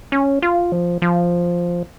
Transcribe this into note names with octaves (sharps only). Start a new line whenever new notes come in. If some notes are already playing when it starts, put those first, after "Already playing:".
C#4
F4
F3
F3